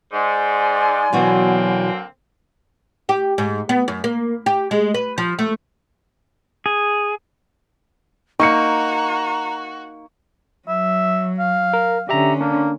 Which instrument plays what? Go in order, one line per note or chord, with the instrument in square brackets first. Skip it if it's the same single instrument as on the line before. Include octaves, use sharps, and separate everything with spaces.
[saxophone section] G#2 [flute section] D5 G#5 C6
[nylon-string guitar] B2 E3 F#4 [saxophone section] D3 A#3 C4 [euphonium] F#3
[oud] G4
G#2
B3
F#2
A#3
G4
G#3
B4
F3
A3
[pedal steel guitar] G#4
[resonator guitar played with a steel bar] A#3 D#4 [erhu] F#4 [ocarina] A#5 [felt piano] C#6 C#7
[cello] F#3 [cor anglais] E5
[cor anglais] F5
[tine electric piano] A#4
[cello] D3 C#4 [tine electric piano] G4 E5 A#5
[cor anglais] A#3 [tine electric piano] D4